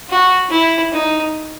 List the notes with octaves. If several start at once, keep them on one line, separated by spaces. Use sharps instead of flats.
F#4
E4
D#4